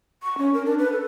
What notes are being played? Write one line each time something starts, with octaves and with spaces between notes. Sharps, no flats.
C#6
C#4
A#4
D4
B4
A4